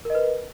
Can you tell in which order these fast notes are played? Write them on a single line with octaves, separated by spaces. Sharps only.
A#4 D#5 B4